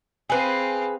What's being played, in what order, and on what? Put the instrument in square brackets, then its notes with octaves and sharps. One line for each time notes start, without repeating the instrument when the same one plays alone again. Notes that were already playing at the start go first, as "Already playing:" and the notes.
[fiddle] C4 F5 [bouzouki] G#4 B4